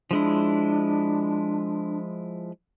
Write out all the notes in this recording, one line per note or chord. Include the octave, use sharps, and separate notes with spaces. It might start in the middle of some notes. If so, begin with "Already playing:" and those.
F3 G#3 D4 E4